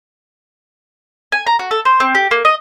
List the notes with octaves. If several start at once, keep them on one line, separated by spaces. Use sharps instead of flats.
G#5
A#5
F#4
A4
C5
C4
G4
A#3
D#5